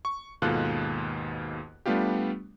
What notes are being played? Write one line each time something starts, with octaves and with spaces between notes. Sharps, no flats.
C#6
D#2 G#2 B2 F4 A4 F#6
G3 A3 B3 D4 F4 G4